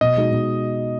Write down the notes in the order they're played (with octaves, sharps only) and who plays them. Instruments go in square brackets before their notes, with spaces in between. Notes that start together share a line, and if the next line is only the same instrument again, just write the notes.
[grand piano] B2 [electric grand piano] D#5
[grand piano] G#3 D#4 F#4
B2